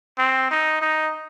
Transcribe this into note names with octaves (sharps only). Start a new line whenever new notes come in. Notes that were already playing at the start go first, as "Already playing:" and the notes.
C4
D#4
D#4